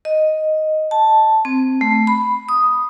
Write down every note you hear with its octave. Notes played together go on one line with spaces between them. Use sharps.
D#5
A5
C4
A3
B5
D#6